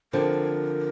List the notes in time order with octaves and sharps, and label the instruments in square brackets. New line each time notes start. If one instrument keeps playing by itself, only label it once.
[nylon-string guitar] D3 F3 C4 [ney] A#4